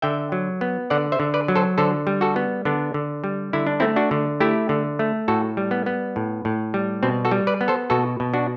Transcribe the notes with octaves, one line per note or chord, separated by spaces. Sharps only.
D3 E5 G5
F#3
B3
D3 D5 F#5
C5 E5
D3
B4 D5
F#3
A4 C5
D3 A4 C5
G3
F#4 A4
B3
D3 B3 D4
D3
G3
D3 E4
D4
A3 C4 E4
D4 F#4
D3
A3 E4 G4
D3
A3
A2 F#4 A4
G3
B3
B3
A2
A2
G3
B2 C4
F#4 A4
G3
B4 D5
B3
A4 C5
B2 F#4 A4
B2
D4 F#4